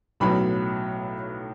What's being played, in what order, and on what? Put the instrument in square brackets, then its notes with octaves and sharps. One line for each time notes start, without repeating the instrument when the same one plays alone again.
[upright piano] B1 A2 F#3 B3 B5